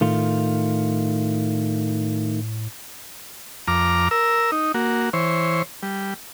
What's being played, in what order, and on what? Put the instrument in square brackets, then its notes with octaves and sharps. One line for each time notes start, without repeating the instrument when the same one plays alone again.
[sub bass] A2 [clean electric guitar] D#3 A3 F4
[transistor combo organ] F2 A#5 D6 F6
A#4 E6
D#4
A#3 F#4
E3 C5 C#5
G3